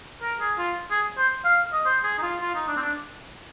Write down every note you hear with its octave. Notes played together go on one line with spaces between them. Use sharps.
A#4
G#4
F4
G#4
C5
F5
D#5
C5
G#4
D#4
F4
F4
D#4
D4
C4
D4